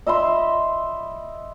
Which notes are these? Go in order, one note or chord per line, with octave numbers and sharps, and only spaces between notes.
D#5 E5 B5 C6